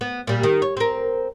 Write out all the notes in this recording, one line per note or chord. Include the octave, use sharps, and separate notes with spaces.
B3
A#2 G3
D#3
C#5
C4 A#4